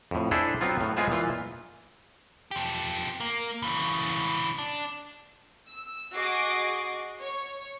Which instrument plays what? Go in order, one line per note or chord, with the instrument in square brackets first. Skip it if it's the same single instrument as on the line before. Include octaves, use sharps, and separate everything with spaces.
[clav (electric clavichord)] F2 A2
D4 E4 G#4 A4 C5
F#3 B3 C4 F4
A2
G#3 B3 F4 G#4 C5
A#2 E3 F4
[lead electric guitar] F3 G4
A#3
C#3 E3
D4
[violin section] E6
F#4 G#4 D#5 D6 C7
C#5